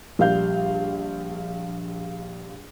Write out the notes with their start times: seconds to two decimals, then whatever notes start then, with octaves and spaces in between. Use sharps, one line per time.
0.19 A#1 G3 F5 G6